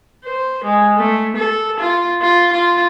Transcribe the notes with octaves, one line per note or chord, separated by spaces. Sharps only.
C5
G#3
A3
A4
F4
F4
F4